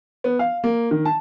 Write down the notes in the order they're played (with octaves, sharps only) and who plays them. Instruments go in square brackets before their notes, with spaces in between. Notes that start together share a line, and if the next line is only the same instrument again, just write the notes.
[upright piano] B3
F5
A#3
D#3
A5